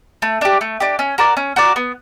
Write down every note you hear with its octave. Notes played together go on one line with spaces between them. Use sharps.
A3
D4 G4
A3
D4 G4
C#4
F#4 A#4 D5
C#4
F#4 A#4 D5
B3